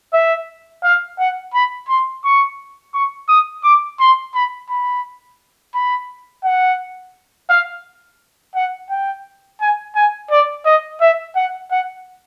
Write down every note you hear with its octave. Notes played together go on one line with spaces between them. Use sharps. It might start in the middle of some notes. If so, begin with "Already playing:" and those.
E5
F5
F#5
B5
C6
C#6
C#6
D#6
D6
C6
B5
B5
B5
F#5
F5
F#5
G5
G#5
G#5
D5
D#5
E5
F#5
F#5